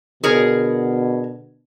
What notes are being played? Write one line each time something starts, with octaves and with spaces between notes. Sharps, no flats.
B2 D3 G#4 A#4 C#5